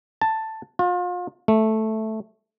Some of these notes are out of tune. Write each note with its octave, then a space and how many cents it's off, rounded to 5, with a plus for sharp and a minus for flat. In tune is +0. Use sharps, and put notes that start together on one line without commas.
A5 +5
F4 +35
A3 -5